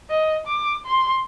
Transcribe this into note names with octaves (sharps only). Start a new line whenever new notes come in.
D#5
D6
C6